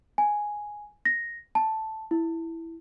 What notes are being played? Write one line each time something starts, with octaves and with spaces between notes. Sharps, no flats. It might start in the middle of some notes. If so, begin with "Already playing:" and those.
G#5
A#6
A5
E4